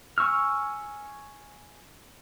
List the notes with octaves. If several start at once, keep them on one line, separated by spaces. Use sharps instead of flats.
G#5 C#6 E6 F6